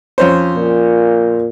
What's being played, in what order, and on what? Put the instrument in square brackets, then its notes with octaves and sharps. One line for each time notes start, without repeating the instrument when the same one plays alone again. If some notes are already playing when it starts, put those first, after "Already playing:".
[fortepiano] F2 C#4 C5
[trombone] A#2